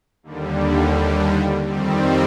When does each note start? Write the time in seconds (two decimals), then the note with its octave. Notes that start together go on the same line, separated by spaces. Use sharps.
0.23 D#2 D3 G3
1.65 F2 D#3 G3 C4